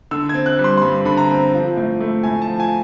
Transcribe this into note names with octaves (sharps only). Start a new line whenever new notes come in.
D3 E6
C4 G#6
F#6
G3
C6
C6
G2 B5
D3 B5
A#5
C4
F3
A2
A3
A2 G#5
A5
F3
G#5